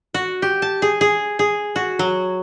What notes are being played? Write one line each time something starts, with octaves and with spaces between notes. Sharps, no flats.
F#4
G4
A5
G#4
G#4
G#4
F#4
F#3